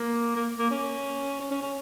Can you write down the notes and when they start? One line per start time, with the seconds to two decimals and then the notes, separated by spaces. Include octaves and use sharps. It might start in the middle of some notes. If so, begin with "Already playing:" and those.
Already playing: A#3
0.36 A#3
0.59 A#3
0.71 C#4
1.40 C#4
1.51 C#4
1.62 C#4